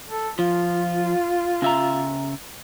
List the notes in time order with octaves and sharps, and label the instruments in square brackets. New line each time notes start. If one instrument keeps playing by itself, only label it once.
[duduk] A4
[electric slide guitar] F3 [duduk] F4
[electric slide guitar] C#3 E5 A#5